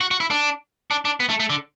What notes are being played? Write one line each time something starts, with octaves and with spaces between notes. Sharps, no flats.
F#4
F#4
E4
D4
D4
D4
B3
A3
A3
D3